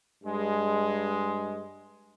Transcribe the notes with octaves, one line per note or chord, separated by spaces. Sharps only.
G2 G#3